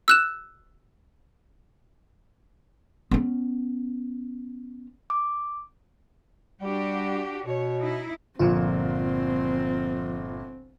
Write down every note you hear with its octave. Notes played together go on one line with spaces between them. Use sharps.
E6 F#6 E7
B3 C#4
D6
G3 D4 F#4 G4
B2 C#5
D#4 E4
G1 A#2 F3 C4 F4